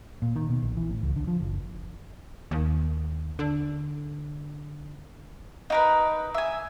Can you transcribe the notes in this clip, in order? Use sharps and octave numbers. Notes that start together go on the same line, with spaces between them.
A#2
D#3
B2
A#1
E3
A1
C#2
D3
F3
F#1
D#2
D3
D#4 A#4 B4
E5 G#5